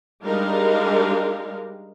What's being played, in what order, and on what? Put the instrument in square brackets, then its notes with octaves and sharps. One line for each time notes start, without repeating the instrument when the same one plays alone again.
[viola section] G3 G#3 D4 D#4 A#4 F5